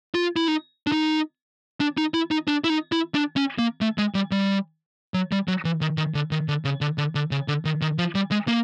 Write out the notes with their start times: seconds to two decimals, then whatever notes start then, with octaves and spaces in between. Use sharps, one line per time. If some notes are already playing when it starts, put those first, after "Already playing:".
0.15 F4
0.36 E4
0.48 D#4
0.87 D4
0.92 D#4
1.80 D4
1.98 D#4
2.14 E4
2.31 D#4
2.48 D4
2.64 E4
2.70 D#4
2.92 E4
3.15 D4
3.36 C#4
3.59 A#3
3.81 A3
3.98 G#3
4.15 G3
4.32 G3
5.14 F#3
5.32 G3
5.48 F#3
5.65 E3
5.81 D#3
5.97 D#3
6.15 D3
6.31 D#3
6.48 D3
6.65 C#3
6.81 D3
6.98 D3
7.15 D3
7.31 C#3
7.48 D3
7.65 D#3
7.82 D#3
7.98 F3
8.15 G3
8.31 G#3
8.48 A#3